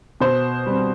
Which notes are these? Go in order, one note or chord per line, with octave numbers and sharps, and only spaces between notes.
B2 C5
G3 C4